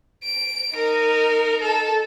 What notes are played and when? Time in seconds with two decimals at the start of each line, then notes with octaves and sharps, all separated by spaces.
0.24 D7
0.76 D#4 A#4
1.61 A4